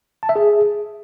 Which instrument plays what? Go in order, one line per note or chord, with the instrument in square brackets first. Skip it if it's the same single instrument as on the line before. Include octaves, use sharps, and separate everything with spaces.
[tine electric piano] A5
E5
G#4